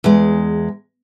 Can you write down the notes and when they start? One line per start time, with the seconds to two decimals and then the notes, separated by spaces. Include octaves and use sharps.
0.04 E2 G#3